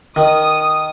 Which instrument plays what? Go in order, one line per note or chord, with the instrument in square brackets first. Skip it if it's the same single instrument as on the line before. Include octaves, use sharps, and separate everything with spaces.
[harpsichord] D#3 [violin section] D#6